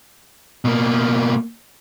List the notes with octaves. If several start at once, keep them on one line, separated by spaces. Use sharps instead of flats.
B2 A#3